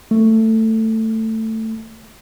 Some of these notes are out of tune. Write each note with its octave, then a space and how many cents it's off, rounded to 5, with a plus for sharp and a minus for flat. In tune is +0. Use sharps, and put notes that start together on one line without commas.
A3 +15